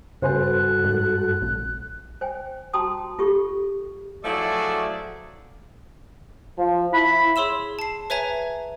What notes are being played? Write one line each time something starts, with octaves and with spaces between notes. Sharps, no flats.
G2 C#3 F#4 A4 B4 C5 G#5 F#6
G#2
A#1
C5 G5 G#5
F#4 G5 A5 A#5 C6 D#6
F4 G4 A4 C#6
F3 F#3 A3 E4 G#4 D5
F3
E4 B5
G#4 C#5 C6 E6 E7
A5 C7
B4 C#5 E5 G#5 A#5 G#6